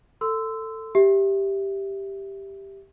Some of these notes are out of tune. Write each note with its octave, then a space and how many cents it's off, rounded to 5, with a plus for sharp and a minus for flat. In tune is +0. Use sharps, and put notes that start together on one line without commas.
A4 +15 C6 -25 E6 +0
G4 +0 E5 +0